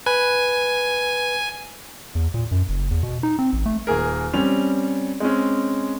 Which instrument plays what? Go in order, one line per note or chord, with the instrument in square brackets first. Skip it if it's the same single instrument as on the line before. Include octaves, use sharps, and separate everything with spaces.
[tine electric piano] B4 [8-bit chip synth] G#5
[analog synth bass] E2
A#2
F#2
F#1
E2
B2
D#4
C4
A1
A3
[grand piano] D#1 A#3 G#4 A#4
G3 C4 C#4 F7
G#3 C4 C#4